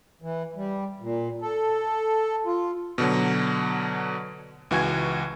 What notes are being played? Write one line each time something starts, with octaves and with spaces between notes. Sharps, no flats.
E3
G3
A#2
A4
F4
B2 D3 F#3
C#2 E3 F#4 G#5 G#6